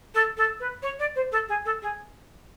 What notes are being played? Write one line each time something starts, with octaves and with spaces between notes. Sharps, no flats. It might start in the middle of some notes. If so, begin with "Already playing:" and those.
A4
A4
B4
C#5
D5
C5
A4
G#4
A4
G#4